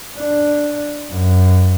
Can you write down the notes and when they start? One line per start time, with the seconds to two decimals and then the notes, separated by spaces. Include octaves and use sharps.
0.18 D4
1.12 F#2